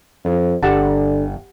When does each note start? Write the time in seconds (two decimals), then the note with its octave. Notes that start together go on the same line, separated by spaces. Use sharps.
0.24 F2
0.63 G1 D3 G4 F#5 A5